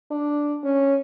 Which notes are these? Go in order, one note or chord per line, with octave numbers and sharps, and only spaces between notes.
D4
C#4